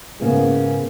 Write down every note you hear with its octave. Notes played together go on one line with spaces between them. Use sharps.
G#2 C#3 A#3 B3 E4 G#4